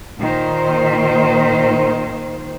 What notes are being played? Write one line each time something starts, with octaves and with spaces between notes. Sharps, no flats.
A#2 D#3 C5